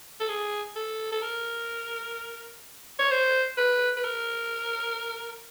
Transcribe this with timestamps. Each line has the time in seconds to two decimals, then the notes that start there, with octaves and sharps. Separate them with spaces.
0.20 A4
0.28 G#4
0.76 A4
1.12 A4
1.22 A#4
2.99 C#5
3.11 C5
3.57 B4
3.97 B4
4.04 A#4